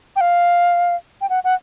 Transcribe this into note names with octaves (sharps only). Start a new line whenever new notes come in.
G5
F5
G5
F#5
F#5